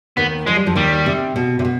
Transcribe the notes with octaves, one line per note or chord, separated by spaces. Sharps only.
D#2 D#3 B3
F3 G#3
G3
F2 F3
D#2 D#3 G3
C3
B2
C3
B2